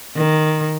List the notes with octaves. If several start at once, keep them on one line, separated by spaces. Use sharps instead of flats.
D#3